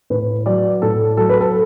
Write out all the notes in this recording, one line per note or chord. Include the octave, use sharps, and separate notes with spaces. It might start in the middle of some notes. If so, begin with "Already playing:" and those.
A2 B4
F#3 D5
A2 A4
F#3 A4
B4
A4